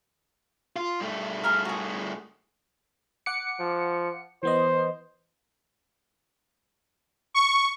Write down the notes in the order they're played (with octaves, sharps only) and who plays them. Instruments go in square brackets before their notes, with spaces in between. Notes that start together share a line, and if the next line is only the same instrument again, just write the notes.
[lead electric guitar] F4
G2 A3
[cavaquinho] G#4 A#4 F5
F#4 G#4
[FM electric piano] F#5 D6 C#7
[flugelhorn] F3
[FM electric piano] E3 B3 D#5 [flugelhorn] C5
[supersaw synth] C#6